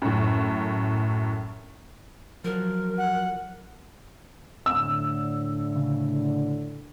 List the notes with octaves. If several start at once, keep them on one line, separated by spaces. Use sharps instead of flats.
F#2 A2
F3 F#3 A#4
F#5
A2 D3 E6
C#3